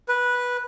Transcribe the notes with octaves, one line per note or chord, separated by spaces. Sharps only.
B4